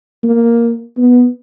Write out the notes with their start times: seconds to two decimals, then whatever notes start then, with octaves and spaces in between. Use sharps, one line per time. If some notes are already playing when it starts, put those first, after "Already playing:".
0.24 A#3
0.97 B3